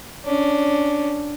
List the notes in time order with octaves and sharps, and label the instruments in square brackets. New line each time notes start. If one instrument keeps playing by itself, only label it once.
[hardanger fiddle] C#4 D4